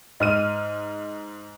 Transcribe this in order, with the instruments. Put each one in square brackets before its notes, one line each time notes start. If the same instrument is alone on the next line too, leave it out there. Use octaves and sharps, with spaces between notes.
[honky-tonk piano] G#2 F6 D#7 [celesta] D#5